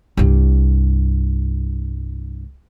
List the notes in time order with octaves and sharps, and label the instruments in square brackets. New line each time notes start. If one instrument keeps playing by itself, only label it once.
[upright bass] C2 G2